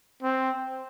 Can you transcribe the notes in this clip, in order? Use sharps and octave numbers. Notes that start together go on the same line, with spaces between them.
C4